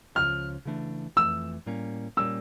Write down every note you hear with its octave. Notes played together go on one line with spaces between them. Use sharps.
C#2 C#3 F3 F6
C#3 E3 A3 D4
F2 E3 A3 E6
A2 G3 A#3 C#4
A#2 G3 A#3 C#4 E6